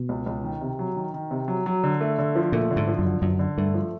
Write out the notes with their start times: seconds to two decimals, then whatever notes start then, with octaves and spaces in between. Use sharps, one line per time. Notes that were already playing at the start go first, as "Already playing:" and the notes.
Already playing: B2
0.09 C#2
0.26 C#2
0.44 D#3
0.61 C3
0.79 F#3
0.96 D#3
1.14 D#3
1.31 C3
1.48 F#3
1.66 F#3
1.83 D3
2.01 A3
2.19 D3
2.35 F3
2.52 A#2 A3
2.70 D3
2.76 G#2
2.87 F3
2.99 F#2
3.05 D3
3.22 F#2 D3
3.39 D3
3.57 G2 A3
3.74 F3